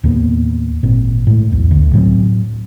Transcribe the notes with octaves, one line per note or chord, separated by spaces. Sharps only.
D#2 A2 A#3 B3
G#1 A#2 C4
A2 G#3 A3
B1 E2
D2
A2 F#3 G3 C4